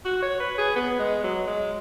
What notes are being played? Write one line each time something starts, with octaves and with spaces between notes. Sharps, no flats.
F#4
C#5
B4
G#4
B3
G#3
F#3
G#3